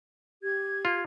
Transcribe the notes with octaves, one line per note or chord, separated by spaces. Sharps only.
G4 G#6
F4